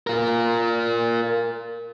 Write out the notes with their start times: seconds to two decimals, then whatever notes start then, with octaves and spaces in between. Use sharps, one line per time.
0.07 F4 A#4